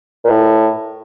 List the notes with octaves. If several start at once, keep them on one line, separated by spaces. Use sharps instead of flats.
A#2
A2